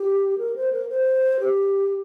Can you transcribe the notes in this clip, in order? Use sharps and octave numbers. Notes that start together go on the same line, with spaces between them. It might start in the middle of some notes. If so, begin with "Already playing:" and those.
Already playing: G4
A#4
C5
A#4
C5
G4